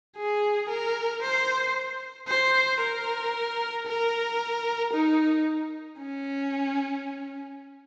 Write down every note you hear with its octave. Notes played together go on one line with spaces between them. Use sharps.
G#4
A#4
C5
C5
A#4
A#4
D#4
C#4